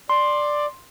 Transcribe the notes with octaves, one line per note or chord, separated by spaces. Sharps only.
D5 C6